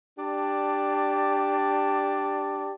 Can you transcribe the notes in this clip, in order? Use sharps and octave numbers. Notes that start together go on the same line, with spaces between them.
D4 G4 D5 A5